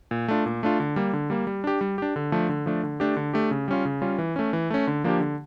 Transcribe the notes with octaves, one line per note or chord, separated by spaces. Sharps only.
A#2
A3 D4 F4
A#2
A3 D4 F4
D3
G3 A#3
D3
G3 A#3
G3
D4 G4
G3
D4 G4
D3
F3 A3 D4
D3
F3 A3 D4
D3
A3 D4 G4
D3
A3 D4 G4
C#3
G3 C#4 F4
C#3
G3 C#4 F4
E3
A3 C#4
E3
A3 C#4
D3
F3 A#3 D4 G4
D3